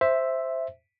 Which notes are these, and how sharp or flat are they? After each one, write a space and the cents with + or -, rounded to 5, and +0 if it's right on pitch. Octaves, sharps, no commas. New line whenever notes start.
C5 +0 E5 +0